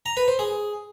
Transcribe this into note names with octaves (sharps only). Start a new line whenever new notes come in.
A#5
B4
C5
G#4